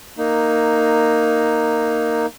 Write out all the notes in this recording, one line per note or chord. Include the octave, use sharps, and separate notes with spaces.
A#3 D#4